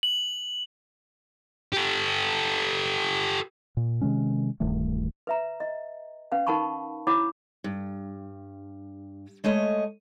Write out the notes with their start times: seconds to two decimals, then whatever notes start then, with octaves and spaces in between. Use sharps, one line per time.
0.03 F#7
1.73 G4 A4
3.77 A#2
4.01 C3 D#3 G#3 C#4
4.60 D1 G2 D#3 A3
5.27 B4 E5 A#5
5.60 D#5
6.32 C#4 B4 F5 F#5
6.47 D#4 A#4 F#5 A5 B5 C#6
7.07 E4 C#5 F#5 B5 D6
7.64 G2
9.44 G#3 A3 C#5 D#5